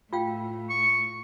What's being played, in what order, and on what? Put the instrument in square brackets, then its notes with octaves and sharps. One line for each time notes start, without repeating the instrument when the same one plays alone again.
[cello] A2 [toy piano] F4 F5 G5
[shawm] C#6